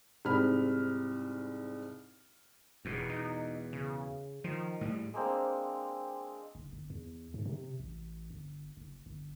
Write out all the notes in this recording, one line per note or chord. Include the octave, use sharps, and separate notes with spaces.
C2 G#2 C4 B5 F6
F1 E2 B2
D#4
C#3
D#3 F3
A2 G3
G#3 A#3 C4 D4
F#1
G1
E2
G#2
C3
A1
G1
F#1
G1